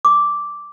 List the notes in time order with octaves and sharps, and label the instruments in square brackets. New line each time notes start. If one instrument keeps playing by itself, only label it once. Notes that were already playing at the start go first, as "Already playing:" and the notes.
[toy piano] D6